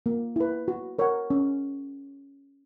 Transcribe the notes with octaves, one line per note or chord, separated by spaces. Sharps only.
A#3
E4 B4
F#4
A#4 C#5 F#5
C#4